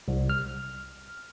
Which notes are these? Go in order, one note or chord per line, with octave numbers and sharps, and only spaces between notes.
C2
F6